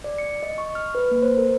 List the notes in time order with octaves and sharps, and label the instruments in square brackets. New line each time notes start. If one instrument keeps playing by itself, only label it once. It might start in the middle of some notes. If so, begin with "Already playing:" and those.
[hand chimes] D5
C#7
D#5
C#6
F6
B4
A#3
C5
A#4